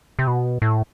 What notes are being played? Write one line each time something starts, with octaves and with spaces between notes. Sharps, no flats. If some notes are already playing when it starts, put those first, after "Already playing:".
C3
B2
A2